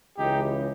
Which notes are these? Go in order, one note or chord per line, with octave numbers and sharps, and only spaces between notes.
C#2 C#3 E3 D#4 G4